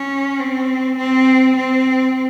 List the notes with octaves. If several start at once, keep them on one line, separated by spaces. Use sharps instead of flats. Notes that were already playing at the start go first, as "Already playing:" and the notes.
Already playing: C#4
C4
C4
C4